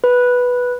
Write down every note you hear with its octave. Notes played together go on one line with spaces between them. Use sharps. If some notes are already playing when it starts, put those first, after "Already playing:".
B4